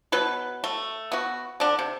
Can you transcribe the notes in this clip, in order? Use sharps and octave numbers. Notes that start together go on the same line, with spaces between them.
B2 F#3 B4
A3
B3 F#4
D3 D4
C3